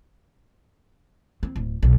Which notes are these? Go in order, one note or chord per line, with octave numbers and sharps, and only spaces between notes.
C4
D1
E1 B1